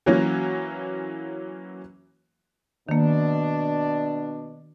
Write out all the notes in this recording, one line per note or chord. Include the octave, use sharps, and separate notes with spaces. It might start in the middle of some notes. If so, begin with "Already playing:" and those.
E3 F#3 A#3 C#4
B2 D#3 A#3 D4